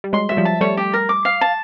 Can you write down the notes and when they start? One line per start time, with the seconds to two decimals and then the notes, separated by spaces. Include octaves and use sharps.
0.04 G3
0.13 F#3 G#3 C6
0.29 F#3 E5
0.37 F3 G3
0.45 A5
0.61 G3 A3 C#5
0.77 G4
0.94 A#4
1.09 D6
1.25 F5
1.41 A5